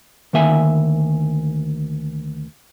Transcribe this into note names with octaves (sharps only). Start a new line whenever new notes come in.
D2 D#3 A#3 E5 G#5